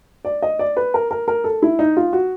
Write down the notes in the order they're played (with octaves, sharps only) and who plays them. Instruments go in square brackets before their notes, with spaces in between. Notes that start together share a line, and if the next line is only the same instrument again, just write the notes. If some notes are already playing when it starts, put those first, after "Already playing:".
[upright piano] D5
D#5
D5
B4
A#4
A#4
A#4
A4
E4
D#4
F4
F#4